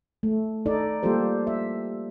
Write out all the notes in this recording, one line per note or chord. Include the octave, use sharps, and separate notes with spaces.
A3
D#4 A4 D5
G3 A#3 F4 G4 A4 C5
E5